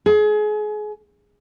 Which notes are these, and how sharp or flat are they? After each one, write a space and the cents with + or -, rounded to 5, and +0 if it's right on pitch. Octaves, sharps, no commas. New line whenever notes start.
G#4 +30